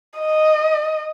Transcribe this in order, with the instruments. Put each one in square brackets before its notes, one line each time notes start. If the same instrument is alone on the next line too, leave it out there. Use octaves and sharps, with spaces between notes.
[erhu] D#5